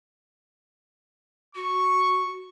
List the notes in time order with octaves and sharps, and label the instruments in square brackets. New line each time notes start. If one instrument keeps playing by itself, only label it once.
[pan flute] F#4 [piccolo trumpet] C#6